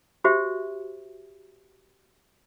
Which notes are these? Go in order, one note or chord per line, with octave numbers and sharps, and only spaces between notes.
F#4 G4 C5 E5